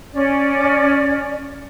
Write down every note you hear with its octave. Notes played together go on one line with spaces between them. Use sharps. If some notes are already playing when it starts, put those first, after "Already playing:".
C#4 D5